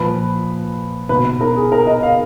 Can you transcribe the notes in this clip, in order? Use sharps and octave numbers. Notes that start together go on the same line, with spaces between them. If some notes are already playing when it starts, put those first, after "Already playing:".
Already playing: A#2 F3 B4
B2 B4
A#4
G#4
A#4
D#5
F5